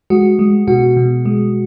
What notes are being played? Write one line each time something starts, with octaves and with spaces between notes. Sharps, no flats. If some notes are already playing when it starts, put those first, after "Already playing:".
G#3 F#4
G#3
B2 F#4
B2
G#3